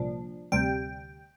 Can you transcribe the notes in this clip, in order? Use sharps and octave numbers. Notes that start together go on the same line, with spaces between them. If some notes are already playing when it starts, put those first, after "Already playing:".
Already playing: C2 A#2 F3 D4
D2 C3 G3 G5